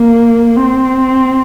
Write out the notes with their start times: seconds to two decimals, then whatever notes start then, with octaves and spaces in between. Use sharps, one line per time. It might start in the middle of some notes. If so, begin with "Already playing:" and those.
Already playing: A#3
0.56 C4